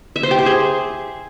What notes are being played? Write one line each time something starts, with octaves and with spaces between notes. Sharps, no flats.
E5
C5
G4
C5
G#4